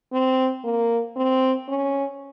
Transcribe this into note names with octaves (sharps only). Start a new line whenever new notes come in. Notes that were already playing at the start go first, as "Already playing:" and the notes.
C4
A#3
C4
C#4